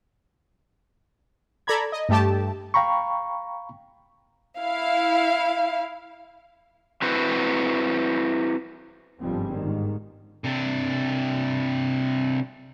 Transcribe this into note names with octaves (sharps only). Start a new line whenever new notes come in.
A4 D5 A#5 B5 G#6
D#5
G2 A3 G4 A5
F5 G5 A#5 B5 C#6
E4 F5
C4 E4 F#4 B4 C5
G1 G#2 F3 G3 G#3 C4
G#2 D#3
C3 D4